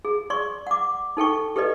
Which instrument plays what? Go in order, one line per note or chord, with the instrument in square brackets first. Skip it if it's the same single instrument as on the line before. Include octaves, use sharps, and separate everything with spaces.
[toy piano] G#4
D5 C6 C#6
F#5 D6
D#4 A4 G5 C#6
G4 A4 B4 D5 D#5